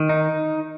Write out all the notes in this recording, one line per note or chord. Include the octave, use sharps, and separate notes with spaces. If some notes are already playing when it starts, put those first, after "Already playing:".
Already playing: D#3
D#4